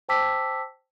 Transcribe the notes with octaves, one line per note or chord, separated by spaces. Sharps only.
C5 G5 A5 D6 E6 B6